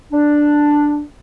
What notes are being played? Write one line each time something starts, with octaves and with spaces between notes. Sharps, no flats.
D4